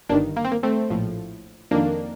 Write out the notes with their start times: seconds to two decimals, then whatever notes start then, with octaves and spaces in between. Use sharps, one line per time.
0.09 G1 G2 D#3 A#3 D4
0.36 A#3
0.45 C4
0.52 A#3
0.63 A3 C4
0.90 A#1 A2 F3
1.71 F2 D#3 A#3 D4